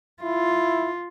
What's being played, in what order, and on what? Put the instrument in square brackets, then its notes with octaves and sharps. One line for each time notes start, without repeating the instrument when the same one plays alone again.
[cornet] E4 [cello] F4